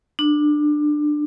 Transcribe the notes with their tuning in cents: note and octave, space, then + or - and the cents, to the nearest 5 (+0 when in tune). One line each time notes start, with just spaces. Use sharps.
D4 +20